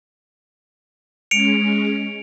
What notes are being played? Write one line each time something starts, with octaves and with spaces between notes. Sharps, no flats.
G#3 C#4 C#7 D7 F7